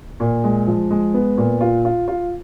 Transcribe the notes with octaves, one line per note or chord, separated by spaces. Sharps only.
A#2
G#3
F3
G#3
B3
A#2
F4
F4
F4